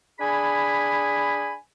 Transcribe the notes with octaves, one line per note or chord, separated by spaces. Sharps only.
D4 G#4 G#5 B5